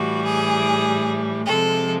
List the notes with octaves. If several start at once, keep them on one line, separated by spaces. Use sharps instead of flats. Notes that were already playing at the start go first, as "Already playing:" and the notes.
Already playing: A2 E3 G3 F#4
G#4
C3 F3 G#3 A4